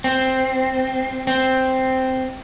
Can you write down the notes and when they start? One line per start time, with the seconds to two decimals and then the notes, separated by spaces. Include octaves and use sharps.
0.04 C4
1.27 C4